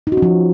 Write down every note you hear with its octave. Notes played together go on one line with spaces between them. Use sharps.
D#4
F#4
C#4
F3